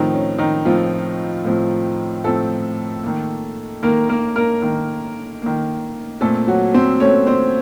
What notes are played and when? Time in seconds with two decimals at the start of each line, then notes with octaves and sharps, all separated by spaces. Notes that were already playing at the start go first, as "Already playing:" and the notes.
Already playing: A2 D#3 F3 C4 D#4
0.12 C#4
0.38 D#3 D#4
0.65 A2 F3 C4 F4
1.45 A2 F3 C4
2.24 A2 F3 A3 C4 A4
3.04 D#3 A#3
3.83 D#3 A#3 A#4
4.09 A#3 A#4
4.36 A#3 A#4
4.62 D#3 A#3
5.42 D#3 A#3
6.21 A#2 A3 C4 A4
6.47 F#3 F#4
6.74 C4 C5
7.00 A#2 A3 C4 C#4 C#5
7.27 C4 C5